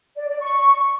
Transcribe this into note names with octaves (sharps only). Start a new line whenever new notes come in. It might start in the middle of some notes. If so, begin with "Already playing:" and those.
D5
D5
C#6